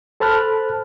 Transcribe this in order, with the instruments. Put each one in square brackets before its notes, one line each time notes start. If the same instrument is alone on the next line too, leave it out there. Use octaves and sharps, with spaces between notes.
[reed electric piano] A4 C5 A5 B5 F6 F#6